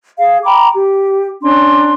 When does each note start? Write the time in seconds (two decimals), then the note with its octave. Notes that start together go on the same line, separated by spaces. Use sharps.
0.19 G#4 F5
0.44 G5 A#5 B5 D6
0.75 G4
1.42 C#4 D4 C6